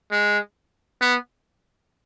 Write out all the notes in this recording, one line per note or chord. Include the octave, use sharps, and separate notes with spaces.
G#3
B3